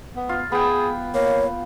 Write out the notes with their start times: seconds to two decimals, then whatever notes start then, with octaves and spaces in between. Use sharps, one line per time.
0.16 B3
0.29 F4
0.52 B3 G#4 G5
1.14 A#3 C#5